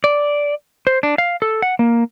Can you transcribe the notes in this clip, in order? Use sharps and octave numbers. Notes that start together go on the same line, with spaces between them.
D5
C5
D4
F5
A4
F#5
A#3